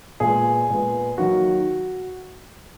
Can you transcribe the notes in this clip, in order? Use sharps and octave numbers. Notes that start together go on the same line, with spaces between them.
A#2 G#3 B3 G#4
A#2 G#3 B3
D#3 F#3 A#3 F#4